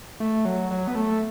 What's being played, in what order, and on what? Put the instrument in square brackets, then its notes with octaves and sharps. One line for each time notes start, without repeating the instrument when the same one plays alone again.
[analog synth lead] A3
F#3
F#3
B3
A3